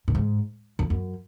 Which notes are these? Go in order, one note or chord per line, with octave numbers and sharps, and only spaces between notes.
A#2
G#2
F2
F#2